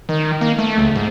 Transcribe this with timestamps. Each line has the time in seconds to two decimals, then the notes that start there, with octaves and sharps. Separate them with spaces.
0.09 D#3
0.41 A#3
0.59 A3
0.78 C#2
0.96 G#2